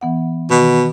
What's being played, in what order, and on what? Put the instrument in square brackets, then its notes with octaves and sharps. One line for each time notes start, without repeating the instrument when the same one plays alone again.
[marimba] E3 B3 F#5
[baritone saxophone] B2 [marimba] D#3